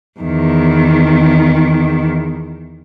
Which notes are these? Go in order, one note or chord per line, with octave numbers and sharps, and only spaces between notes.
E2 D#3